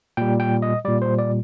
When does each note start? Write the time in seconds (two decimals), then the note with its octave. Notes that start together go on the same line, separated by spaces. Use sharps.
0.17 A#2 G3 G5
0.40 G5
0.62 D#5
0.85 A#2 G3 D5
1.02 C5
1.19 D5